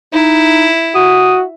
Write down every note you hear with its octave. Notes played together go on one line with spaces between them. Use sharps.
D#4 E4
F#4 D#6